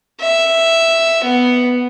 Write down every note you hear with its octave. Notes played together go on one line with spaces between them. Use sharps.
E5
B3